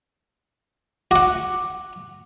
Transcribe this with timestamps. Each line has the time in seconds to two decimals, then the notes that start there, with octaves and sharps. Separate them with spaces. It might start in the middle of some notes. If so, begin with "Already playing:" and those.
1.11 F#4 F#5 D6